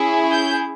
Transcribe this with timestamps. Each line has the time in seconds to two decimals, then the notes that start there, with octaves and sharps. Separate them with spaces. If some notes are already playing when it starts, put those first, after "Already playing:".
Already playing: C#4 E4 G#4
0.31 G6